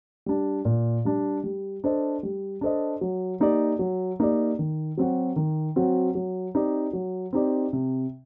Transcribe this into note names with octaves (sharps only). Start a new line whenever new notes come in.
G3 D4
A#2
G3 D4
G3
D4 A4 C5 D#5
G3
D4 A4 C5 D#5
F#3
A#3 D#4 G4 D5
F#3
A#3 D#4 G4 D5
D#3
F#3 C4 F#4
D#3
F#3 C4 F#4
F#3
C4 D#4 G4 D5
F#3
C4 D#4 G4 D5
C3